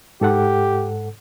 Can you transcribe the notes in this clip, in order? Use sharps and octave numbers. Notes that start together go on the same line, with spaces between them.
G#2 G4 A4 F#5